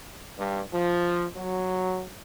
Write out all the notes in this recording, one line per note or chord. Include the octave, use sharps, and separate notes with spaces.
G2
F3
F#3